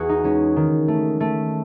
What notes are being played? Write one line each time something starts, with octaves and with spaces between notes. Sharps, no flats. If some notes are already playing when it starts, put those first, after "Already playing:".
Already playing: E2 F#4 G#4
D#4
G#3 C#4
D#3
A3
A3